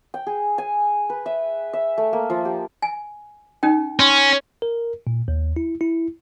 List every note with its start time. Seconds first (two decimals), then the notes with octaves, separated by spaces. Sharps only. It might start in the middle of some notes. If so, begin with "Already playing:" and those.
0.14 G5
0.27 G#4
0.58 G#5
1.10 B4
1.26 E5
1.73 E5
1.98 A3
2.13 A#3
2.30 F3
2.45 G4
2.82 G#5
3.63 C#4 D#4 G5
4.00 C#4 C6
4.62 A#4
5.07 A#2
5.28 D#2
5.56 E4
5.81 E4